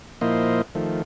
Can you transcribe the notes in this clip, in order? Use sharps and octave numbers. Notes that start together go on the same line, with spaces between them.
A#2 F3 A#3 E4 C5 D#5
D#3 F3 A3